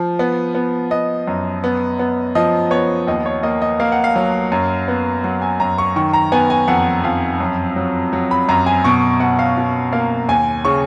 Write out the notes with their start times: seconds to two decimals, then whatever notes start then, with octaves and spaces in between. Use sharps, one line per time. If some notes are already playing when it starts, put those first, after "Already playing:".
Already playing: F3
0.19 B3
0.55 B3
0.91 B3 D#5
1.28 F#2
1.64 B3
1.99 B3
2.35 F3 D#5
2.71 B3 C#5
3.07 D#2 D#5
3.26 C#5
3.43 A#3 D#5
3.62 D#5
3.80 A#3 F5
3.92 F#5
4.04 F5
4.16 F#3
4.52 F#2
4.88 B3
5.24 F#3
5.42 G#5
5.60 F#2 A#5
5.78 C#6
5.96 D#3 C#6
6.13 A#5
6.32 B3 G#5
6.50 G#5
6.68 F2 F#5
7.04 F2 F5
7.40 F#2
7.76 F#3
8.13 F#3
8.31 B5
8.49 F#2 A#5
8.66 G#5
8.84 B2 C#6
9.20 B2 F#5
9.39 F5
9.57 B2
9.93 A#3 F5
10.29 D#2 G#5
10.65 C#3 C#6